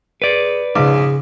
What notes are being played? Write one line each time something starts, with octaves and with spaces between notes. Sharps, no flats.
G#4 B4 D5
A#1 G#2 C#3 G#4 D6